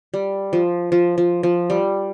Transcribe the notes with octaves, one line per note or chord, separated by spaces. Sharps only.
G3
F3
F3
F3
F3
G3